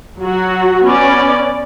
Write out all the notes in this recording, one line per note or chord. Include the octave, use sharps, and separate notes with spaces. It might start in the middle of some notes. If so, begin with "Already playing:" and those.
F#3 F#4
B3 C#4 D5